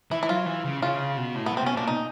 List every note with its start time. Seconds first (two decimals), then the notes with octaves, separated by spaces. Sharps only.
0.11 E3 E4
0.23 E4
0.29 F#3 F4
0.46 E3
0.64 C#3
0.82 C#3 F4
1.17 B2
1.35 A2
1.46 B3
1.53 A#2 C4
1.64 B2 C#4
1.76 A#2 D4
1.88 D#4